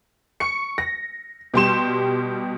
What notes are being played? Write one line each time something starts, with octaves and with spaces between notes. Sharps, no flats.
C#6 C#7
A#6
B2 G3 G4 G5 C6 E7